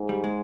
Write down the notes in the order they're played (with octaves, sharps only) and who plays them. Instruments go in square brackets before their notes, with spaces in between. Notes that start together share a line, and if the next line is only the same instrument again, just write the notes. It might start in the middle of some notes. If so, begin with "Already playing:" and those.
Already playing: [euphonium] G#2
[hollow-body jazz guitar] G3
G#3